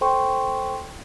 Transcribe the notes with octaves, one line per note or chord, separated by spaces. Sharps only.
A4 C5 G5 C6 C#6